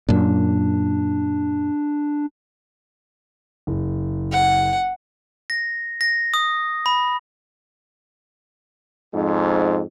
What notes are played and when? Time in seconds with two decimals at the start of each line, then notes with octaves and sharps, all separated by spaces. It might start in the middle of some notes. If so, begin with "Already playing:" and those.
0.09 F#2 A#2 D4
3.67 F#1
4.32 F#5
5.50 A#6
6.01 A#6
6.34 D#6
6.86 B5
9.13 F2 G#2